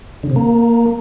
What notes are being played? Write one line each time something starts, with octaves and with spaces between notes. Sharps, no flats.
D3
C3
A#3